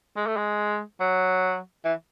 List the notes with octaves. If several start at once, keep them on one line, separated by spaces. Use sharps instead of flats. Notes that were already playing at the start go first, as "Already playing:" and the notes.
G#3
A3
G#3
F#3
E3